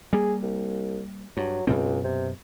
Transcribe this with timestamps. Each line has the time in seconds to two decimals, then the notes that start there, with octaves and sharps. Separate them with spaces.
0.13 G3 A#3 G#4
0.42 C2
1.37 G2 F#3
1.67 C#2 F#2 B2 C4
2.04 C3